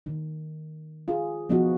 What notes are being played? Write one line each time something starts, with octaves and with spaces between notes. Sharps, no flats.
D#3
F4 G#4
F3 B3 D#4 F#4